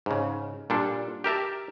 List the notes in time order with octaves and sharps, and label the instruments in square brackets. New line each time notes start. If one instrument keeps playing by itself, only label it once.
[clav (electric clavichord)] G#2 C#3
A#2 G3 D4 A4
G4 A#4 E5 A5